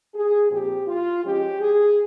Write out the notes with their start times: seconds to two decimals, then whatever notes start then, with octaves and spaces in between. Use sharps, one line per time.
0.14 G#4
0.50 A#2 F3 C4 G4
0.87 F4
1.23 F3 G#3 C#4 G4
1.60 G#4